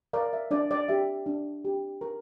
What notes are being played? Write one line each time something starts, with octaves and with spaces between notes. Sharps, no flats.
A#4 D5 F5
E5
D4 D5
D5
G4 E5
D4
G4
A#4